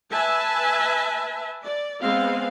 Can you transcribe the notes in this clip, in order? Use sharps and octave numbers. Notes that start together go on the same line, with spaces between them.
B4 E5 G#5 A5
D5
G#3 B3 C4 F5